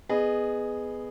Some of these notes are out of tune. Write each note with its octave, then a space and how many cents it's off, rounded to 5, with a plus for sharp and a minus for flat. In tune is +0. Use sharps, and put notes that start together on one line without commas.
B3 +10 G#4 +0 D#5 -20